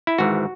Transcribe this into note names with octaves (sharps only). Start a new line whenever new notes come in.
E4
G#1 G#2 E3 F#4